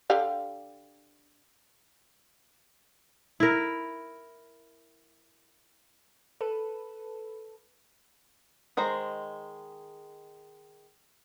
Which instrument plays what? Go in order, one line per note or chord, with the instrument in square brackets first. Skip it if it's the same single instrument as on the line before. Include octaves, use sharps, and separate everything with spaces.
[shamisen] D3 G4 F5
[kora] E4 A#4
[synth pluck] A4 B4
[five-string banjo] D#3 G#3 C5 A#5